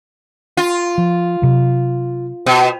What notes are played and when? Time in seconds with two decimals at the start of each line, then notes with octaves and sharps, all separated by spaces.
0.57 F4
0.98 F3
1.42 C3 F#3
2.46 B2